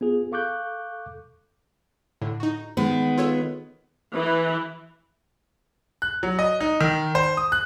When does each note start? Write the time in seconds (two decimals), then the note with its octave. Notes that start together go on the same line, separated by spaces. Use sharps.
0.01 B3 F4 G#4
0.32 A4 F5 C#6 D6 F#6 G6
2.21 A2 D3 D4
2.40 D#4 F#4
2.77 D#3 G#3 B3
3.17 F4 A4 C#5
4.12 E3
6.02 F#6
6.23 F#3
6.39 D#5
6.60 D#4
6.81 D#3
7.15 C5
7.37 D#6
7.52 F#6